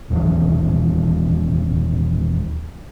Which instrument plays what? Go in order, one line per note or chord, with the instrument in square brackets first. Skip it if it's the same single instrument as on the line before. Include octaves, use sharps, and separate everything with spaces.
[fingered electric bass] E1 D#2 E3 F#3